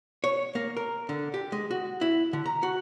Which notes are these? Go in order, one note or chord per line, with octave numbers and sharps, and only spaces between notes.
C#5
A#3
A#4
D3
G4
G#3
F#4
E4
D3
A#5
F#4